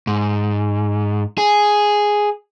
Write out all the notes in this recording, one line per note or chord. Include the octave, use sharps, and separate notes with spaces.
G#2
G#4